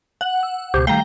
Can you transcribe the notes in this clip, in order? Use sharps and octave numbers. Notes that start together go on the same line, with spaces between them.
F#5
E6
C#2 B2 G4 C5
D#3 G3 A3 F5 G5 A#5